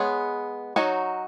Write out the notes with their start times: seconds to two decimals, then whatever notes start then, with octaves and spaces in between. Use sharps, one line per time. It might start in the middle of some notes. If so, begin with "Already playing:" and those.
Already playing: G#3 B3 G#4 C#5
0.76 F#3 D#4 F#4 C#5